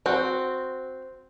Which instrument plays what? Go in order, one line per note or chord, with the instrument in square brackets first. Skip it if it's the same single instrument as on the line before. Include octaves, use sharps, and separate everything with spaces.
[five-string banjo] C4 F#4